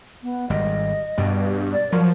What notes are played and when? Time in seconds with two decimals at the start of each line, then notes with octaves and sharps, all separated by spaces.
0.23 B3
0.50 G#1 G3 D#5
1.18 G2 B2 G3
1.72 D5
1.92 F3 F#3 A#4